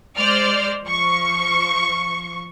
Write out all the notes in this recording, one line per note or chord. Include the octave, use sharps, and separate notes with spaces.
G#3 C5 D5 F6
F3 C#6